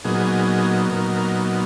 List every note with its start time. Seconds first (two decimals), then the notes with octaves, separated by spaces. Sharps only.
0.04 A#2 F#3 B3 D#4 G#4
0.92 A#2 F#3 B3 D#4 A#4
1.14 A#4